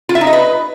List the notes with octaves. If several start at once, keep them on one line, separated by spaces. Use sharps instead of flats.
F4
E5
D#4
D#5
B4